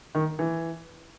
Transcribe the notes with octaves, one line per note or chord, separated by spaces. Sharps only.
D#3
E3